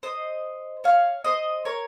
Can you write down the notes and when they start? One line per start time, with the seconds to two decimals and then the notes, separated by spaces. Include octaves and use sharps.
0.03 C5 D#5
0.84 C#5 F5
1.24 C5 D#5
1.65 A#4 C#5